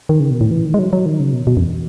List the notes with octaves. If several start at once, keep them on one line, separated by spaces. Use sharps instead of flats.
D#3
C#3
B2
A2
E3
D#3
G#3
F#3
F#3
D#3
C#3
B2
B2
F#2
E2